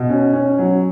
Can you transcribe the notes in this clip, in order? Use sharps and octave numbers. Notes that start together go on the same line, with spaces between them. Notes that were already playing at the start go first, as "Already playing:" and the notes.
Already playing: B2
C#4
C#4
F#3